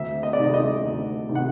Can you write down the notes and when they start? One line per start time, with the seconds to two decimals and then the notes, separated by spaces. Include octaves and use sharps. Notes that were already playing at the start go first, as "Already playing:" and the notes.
Already playing: D2 E5
0.23 D#5
0.33 D5
0.39 C3 D#3 D#5
0.54 D#5
0.84 D2
1.29 C3 D#3
1.35 F#5